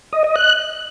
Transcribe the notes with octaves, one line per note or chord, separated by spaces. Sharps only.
D#5
D#5
F#6